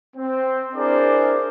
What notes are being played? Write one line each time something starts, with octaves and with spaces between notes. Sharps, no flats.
C4
D4 E4 G#4 A#4 C5 D5